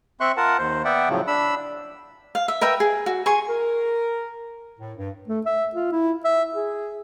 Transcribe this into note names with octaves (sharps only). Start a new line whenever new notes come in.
C4 E5 C6 C#6 F#6
F4 A#4 F#5 A5
D#2 C5
B3 D5 E5 F#5 G5
A2 C#3 F3 F#3
D4 B5 E6
F5
E5
A#4 B4 E5 G5
G#4
F#4
G#4 G#5 C6 C#6
A#4
A2
G2
A3
E5
F4
E4
E5
G#4